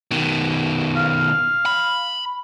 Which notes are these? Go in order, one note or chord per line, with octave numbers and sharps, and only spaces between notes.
B2 D#3
F5
B5